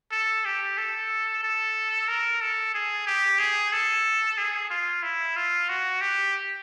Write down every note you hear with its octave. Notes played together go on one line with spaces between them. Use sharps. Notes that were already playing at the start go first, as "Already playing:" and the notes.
A4
G4
A4
A4
A#4
A4
G#4
G4
G#4
A4
G#4
F4
E4
F4
F#4
G4